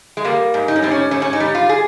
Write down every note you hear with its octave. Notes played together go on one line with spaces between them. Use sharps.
G#3
G3 A#3
G#2
D#4
C#4
G3 C4
C#4
G#2 C#4
C#4
D#4
G3
F4
G#4